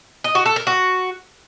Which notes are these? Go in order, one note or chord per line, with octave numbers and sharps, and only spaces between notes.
D#5
F#4
A4
A#4
F#4